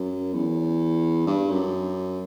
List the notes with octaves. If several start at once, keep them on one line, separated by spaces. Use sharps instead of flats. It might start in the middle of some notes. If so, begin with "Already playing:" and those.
Already playing: F#2
E2
G2
F#2